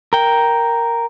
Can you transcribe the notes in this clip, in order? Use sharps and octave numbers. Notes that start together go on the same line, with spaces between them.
A#4 G5